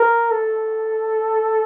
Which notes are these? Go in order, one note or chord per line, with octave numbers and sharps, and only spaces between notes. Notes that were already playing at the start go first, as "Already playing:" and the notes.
Already playing: A#4
A4